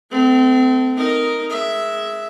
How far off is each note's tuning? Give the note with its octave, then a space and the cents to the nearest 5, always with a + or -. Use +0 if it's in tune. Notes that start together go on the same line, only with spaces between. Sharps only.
A3 +0 C4 -35
D#4 +0 A#4 +0
G#3 +10 E5 +0